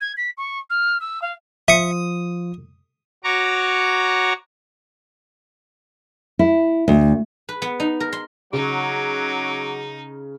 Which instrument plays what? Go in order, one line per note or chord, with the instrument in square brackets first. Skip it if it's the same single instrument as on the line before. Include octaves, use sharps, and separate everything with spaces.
[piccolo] G#6
B6
C#6
F6
E6
F5
[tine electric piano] F3 F4 [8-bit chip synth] E5 C#7 [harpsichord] D#6
[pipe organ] F#4 C#5 A#5 C#6 D6
[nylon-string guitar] E4
D2
[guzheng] B4
B3
D#4
A#4
C6
[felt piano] C#3 [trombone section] F#3 [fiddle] D#4 [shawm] D6